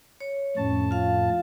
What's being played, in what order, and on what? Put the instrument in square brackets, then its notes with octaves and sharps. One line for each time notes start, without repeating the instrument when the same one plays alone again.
[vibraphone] C#5
[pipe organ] F2 A2 A5 [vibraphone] C#4
[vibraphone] F4 F5